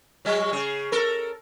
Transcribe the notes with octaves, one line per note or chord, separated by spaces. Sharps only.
F#3 G3
C#3 G#4
A4 A#4